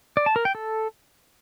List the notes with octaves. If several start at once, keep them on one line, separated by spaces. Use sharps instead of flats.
D5
A5
A#4
G5
A4